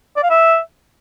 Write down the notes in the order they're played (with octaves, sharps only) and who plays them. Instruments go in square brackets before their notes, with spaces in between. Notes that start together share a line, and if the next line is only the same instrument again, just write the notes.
[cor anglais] D5
F5
E5